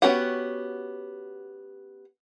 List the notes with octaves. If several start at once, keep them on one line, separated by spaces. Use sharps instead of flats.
B3 C#4 F#4 G4 F#5